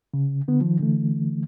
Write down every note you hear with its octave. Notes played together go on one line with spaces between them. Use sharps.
C#3
D3 B3
D#3 F3
D3 E3 A3